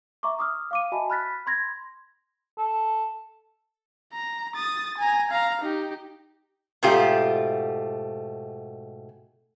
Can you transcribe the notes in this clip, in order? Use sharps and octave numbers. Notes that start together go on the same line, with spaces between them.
E5 A#5 C#6 D6
D6 D#6 F6
F5 D6 D#7
F#4 D#5 E5 G#5 A5 B5
B5 F6 F#6 A6 B6
B5 C6 G#6 A#6
A4
A#5
D#6 A6
G#5 A#5
F5 A#5
D#4 G4
G#2 B2 A3 F4 G4